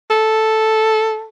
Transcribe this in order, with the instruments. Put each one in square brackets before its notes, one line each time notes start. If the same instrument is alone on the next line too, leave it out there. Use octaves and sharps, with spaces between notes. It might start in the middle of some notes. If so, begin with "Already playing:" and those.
[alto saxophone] A4